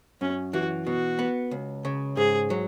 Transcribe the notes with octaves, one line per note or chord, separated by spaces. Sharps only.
F#2 C#4
E3 F#4
B2 F#4
B3
C#2
C#3
G#2 G#4
F#3